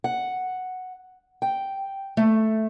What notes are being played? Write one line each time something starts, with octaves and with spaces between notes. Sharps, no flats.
F#5
G5
A3